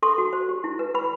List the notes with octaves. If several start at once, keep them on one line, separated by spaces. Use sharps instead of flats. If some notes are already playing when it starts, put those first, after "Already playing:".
A4 C6
F#4
C5
G4
E4
B4
B4 B5